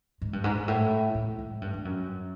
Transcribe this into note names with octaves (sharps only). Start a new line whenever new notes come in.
G#2
G2
G#2
G#2
A2
A2
G#2
G2
G2
F#2